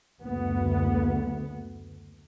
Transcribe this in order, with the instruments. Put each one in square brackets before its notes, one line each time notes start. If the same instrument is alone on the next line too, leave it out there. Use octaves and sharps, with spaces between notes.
[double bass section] F#1 D2 B3